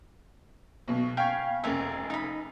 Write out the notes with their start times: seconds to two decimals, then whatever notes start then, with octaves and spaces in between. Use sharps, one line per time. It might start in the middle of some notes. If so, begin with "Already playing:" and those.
0.88 B1 B2
1.17 F5 G5 G#5 B5 C#6 G#6
1.64 F1 C#2 A#4 D5 E5 G#5
2.10 D#4 B5